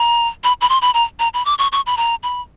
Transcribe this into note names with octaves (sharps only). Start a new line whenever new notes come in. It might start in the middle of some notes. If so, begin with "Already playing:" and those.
Already playing: A#5
B5
B5
C6
B5
A#5
A#5
B5
D6
C#6
C#6
B5
A#5
B5